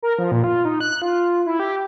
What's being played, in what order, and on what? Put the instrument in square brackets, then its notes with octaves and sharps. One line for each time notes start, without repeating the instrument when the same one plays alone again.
[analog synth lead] A#4
F3
A#2
F4
D#4
F#6
F4
E4
G4